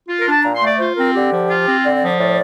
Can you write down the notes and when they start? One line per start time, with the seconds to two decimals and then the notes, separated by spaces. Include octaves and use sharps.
0.08 F4
0.20 A#4
0.26 D4
0.31 A5
0.43 A#2 A#5
0.55 C6
0.61 A3
0.67 D5
0.78 F4 C5
0.96 C4 A#4
1.14 D3 G4
1.32 F3
1.49 F4
1.67 C4
1.84 D3 D5
1.96 D5
2.02 F3
2.08 D5
2.19 A2 D5